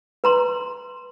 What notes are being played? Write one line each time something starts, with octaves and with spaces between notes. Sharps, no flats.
B4 A#5 C6